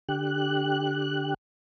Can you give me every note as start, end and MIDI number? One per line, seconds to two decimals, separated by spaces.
0.09 1.34 50
0.09 1.34 67
0.09 1.34 90